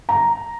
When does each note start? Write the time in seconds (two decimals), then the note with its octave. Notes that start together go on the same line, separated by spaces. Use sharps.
0.09 A#5